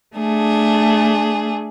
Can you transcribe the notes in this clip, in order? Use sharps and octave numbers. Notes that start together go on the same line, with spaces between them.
A3 D4 G#4